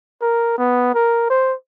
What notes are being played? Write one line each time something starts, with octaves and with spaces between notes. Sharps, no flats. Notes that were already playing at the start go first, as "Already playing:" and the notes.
A#4
B3
A#4
C5